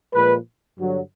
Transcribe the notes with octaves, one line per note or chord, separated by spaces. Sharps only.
A#2 F3 G#3 B4
G2 D3 F#3